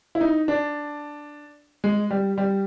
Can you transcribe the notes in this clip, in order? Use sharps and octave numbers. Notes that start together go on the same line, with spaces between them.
E4
D#4
D4
G#3
G3
G3